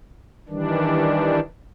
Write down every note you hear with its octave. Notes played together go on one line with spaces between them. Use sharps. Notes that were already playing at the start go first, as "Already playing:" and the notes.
D#3 E3 G3 D4